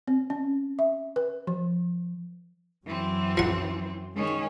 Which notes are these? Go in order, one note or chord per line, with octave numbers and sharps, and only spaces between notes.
C4
C#4
E5
B4
F3
F#2 E3 F#3 C4
F3 F#5
D#3 G#3 C#4